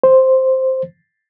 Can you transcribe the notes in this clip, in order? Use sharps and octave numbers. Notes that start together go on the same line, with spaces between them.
C5